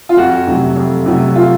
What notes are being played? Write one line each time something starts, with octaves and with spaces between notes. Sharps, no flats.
F4
F2 F#4
C3 F#3 A3
F2
C3 F#3 A3
F4